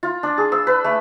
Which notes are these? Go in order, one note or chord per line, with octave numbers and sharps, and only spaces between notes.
F4
D4
G#4
E6
B4
A3